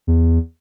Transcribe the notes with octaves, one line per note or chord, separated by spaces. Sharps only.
E2